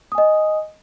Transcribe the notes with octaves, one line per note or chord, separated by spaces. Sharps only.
D#5 G#5 D#6